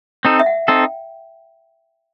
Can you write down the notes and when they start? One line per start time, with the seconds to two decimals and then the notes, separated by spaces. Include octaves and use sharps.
0.25 C4 D#4 A4
0.40 E5
0.46 F#5
0.68 C4 D#4 A4 G5